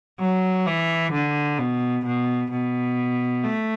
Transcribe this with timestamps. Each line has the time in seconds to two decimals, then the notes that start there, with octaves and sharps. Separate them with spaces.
0.20 F#3
0.67 E3
1.13 D3
1.58 B2
2.05 B2
2.51 B2
3.43 A3